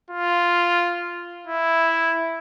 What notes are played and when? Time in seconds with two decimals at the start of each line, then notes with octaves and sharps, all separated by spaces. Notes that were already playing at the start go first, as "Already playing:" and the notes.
0.10 F4
1.47 E4